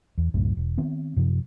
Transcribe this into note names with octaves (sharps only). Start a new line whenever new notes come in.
E2
C2 F#2 A2 D3
E1
D#3 B3 C4
F#2 C3 F3